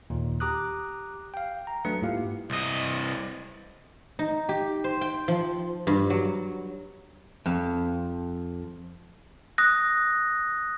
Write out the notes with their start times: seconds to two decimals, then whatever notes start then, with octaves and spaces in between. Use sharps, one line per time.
0.10 D#2 A#2 D#3
0.40 G4 A#5 D6 D#6 F#6
1.34 F5 G5
1.67 A#5
1.85 F#3 A3 D4 B4 C#7
2.02 G#2 A#3 E4 F4 G4 F5
2.50 C2 D#5
4.19 D#4
4.49 G4
4.84 C5
5.01 G5
5.28 F3
5.87 G2
6.10 F#3
7.46 F2
9.58 D#6 F#6 A#6